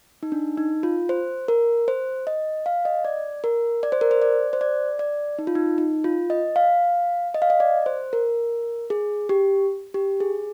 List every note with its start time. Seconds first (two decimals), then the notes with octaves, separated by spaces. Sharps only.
0.23 D#4
0.32 D4
0.57 D#4
0.83 F4
1.09 C5
1.48 A#4
1.88 C5
2.27 D#5
2.66 F5
2.85 D#5
3.05 D5
3.44 A#4
3.83 D5
3.92 C5
4.01 A#4
4.11 C5
4.22 D5
4.53 C5
4.61 D5
4.99 D5
5.39 D#4
5.47 F4
5.55 D#4
5.78 D#4
6.04 F4
6.30 D#5
6.56 F5
7.35 D#5
7.42 F5
7.50 D#5
7.60 D5
7.86 C5
8.13 A#4
8.90 G#4
9.29 G4
9.94 G4
10.20 G#4